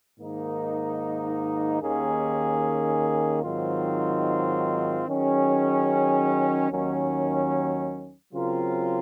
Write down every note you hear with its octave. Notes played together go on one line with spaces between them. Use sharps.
G#2 D#3 A#3 D#4
D#2 D#3 A#3 C#4 G#4
G#2 D#3 F#3 C4 F4
D#3 F#3 C#4 G#4
D#2 D#3 F#3 C#4
C#3 F#3 C4 F4 A#4